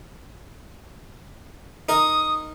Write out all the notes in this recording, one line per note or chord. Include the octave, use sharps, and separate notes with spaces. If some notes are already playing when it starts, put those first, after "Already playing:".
D#4 A#4 D#6